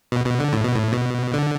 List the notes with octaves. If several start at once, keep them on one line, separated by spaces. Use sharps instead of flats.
B2
B2
D3
A2
B2
A2
B2
D3